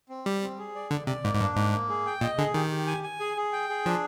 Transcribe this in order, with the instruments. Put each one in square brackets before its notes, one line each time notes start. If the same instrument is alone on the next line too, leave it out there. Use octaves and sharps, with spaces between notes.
[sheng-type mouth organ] C4
[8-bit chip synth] G3 [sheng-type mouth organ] G4
[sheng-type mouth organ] C4
G#4
D5
[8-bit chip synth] D3 [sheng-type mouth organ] D5
[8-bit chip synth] C3 [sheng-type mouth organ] D5
[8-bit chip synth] G#2 [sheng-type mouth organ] A#3
[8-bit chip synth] G#2
[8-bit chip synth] G2 [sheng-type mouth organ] D4
[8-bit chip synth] G#2 [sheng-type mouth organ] A#3
[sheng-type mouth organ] A#3
G#4
G5
[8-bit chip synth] A#2 [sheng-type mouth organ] D#5
[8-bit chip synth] D3 [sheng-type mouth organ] G#4
[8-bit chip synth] D#3 [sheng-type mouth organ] G4
[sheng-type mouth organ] G4
G#5
G#5
G#4
G#4
G5
G#4
[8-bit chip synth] F3 [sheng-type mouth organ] D4